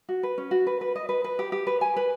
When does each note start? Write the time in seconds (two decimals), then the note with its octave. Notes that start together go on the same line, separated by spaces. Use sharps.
0.09 F#4
0.23 B4
0.38 C#4
0.51 F#4
0.67 B4
0.81 B4
0.96 D#5
1.09 B4
1.24 B4
1.39 G4
1.52 G4
1.67 B4
1.81 G#5
1.96 B4